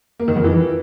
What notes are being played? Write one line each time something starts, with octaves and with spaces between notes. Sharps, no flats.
A#3
D#3
F2
E3